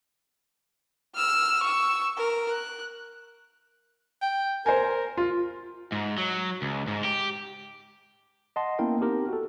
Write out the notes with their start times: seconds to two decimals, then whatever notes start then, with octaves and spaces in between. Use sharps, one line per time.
1.15 E6 F6
1.63 C#6 E6
2.18 A#4
2.51 F#6
4.22 G5
4.66 A#4 C5 G#5
5.17 F4
5.92 G#2
6.18 F#3
6.62 C#2
6.88 G#2
7.05 G4
8.56 D#5 F#5 A5 C6
8.79 A#3 B3 C#4 E4 A#4 G5
9.00 C4 D#4 G4 A#4
9.29 F#4 A4